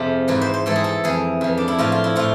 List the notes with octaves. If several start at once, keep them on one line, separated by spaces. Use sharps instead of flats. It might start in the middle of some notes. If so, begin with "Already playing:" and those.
Already playing: F2 C3 F3 G#4
G#2 E3 B4
C5
C5
G#2 E3 A4
G#4
A4
F2 E3 G#4
F2 E3
D4
E4
A2 F3 F4
F4
E4
A2 F3 F4